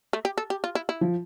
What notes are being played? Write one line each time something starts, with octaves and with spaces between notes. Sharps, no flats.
A3
G4
A4
G4
F4
E4
E4
F3